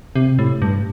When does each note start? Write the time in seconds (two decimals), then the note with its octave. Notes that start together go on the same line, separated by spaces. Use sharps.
0.16 C3
0.39 A2
0.62 G2